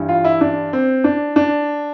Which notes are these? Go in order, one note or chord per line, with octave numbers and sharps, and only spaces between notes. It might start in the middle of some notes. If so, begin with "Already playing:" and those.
Already playing: G2 E3 G3
F4
E4
D4
C4
D4
D4